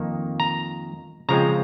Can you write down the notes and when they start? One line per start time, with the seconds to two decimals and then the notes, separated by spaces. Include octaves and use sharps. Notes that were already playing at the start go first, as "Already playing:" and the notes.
Already playing: F2 D#3 A#3
0.40 A#5
1.29 C#3 F3 G#3 C4 A#5